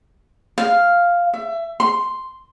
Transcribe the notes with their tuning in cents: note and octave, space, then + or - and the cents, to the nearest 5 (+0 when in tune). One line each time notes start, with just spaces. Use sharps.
F5 +0
E5 +25
C6 +0